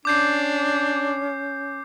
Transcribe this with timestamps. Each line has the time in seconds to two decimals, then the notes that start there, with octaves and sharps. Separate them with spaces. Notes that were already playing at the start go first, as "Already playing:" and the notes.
0.05 C#4 D4 D6 G6 C7